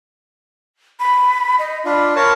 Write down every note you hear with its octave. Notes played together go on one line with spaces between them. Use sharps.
B5
D#5
D4 F4 B5
A#4 C#5 A5 B5